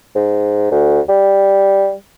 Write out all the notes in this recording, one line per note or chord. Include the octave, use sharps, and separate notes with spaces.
G#2
D2
G3